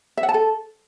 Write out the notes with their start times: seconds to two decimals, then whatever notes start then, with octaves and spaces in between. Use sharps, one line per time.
0.17 E5
0.23 F#5
0.29 A5
0.34 A4